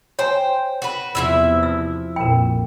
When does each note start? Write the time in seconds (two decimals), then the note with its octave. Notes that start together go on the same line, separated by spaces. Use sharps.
0.19 C5 C#5 G5 G#5
0.82 F#4 B4
1.15 E2 C3 F3 E4 E5
1.63 E6
2.16 A#1 F2 A#4 G5